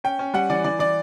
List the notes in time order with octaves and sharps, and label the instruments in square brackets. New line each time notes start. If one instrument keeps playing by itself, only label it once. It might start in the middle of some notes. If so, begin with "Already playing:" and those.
[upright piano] C#4 G5
C#4
G3 F#5
E3 D5
E3 D5
E3 D5